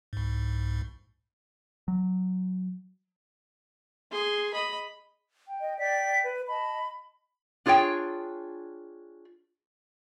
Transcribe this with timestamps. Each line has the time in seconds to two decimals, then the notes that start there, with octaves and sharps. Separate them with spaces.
0.13 C2 G#2
1.88 F#3
4.11 G#4 C6
4.53 D#5 B5
5.47 G5
5.61 D#5
5.79 D5 G5 B6
6.24 B4
6.47 D#5 A5 B5
7.66 D4 F4 G#4 C#5 G5